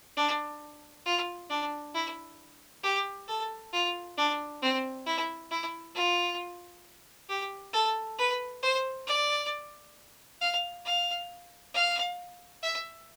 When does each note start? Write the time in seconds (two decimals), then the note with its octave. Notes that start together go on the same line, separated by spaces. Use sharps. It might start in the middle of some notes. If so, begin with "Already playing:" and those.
0.17 D4
1.06 F4
1.50 D4
1.94 E4
2.83 G4
3.28 A4
3.73 F4
4.18 D4
4.62 C4
5.06 E4
5.51 E4
5.95 F4
7.29 G4
7.73 A4
8.18 B4
8.63 C5
9.07 D5
10.41 F5
10.85 F5
11.74 F5
12.63 E5